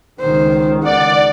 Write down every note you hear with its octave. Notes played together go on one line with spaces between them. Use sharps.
C#2 D#3 C5
D5 F#5